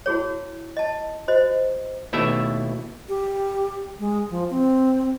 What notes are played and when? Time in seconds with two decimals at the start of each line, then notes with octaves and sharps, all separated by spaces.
0.06 E4 F#4 G#4 C#5
0.77 D#5 A5
1.28 F#4 C5 D#5
2.13 D#2 B2 A3 E4 E5
3.09 G4
3.99 G#3
4.30 F3
4.50 C4